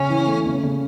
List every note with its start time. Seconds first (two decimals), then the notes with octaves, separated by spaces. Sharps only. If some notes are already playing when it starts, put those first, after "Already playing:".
Already playing: C#3 C#4
0.10 E3
0.27 A3
0.46 C#3
0.63 C#3